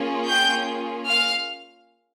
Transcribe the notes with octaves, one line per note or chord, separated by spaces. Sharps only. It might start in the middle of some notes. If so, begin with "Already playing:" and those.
Already playing: A#3 C#4 F4 G#4
G5 G6
F5 F6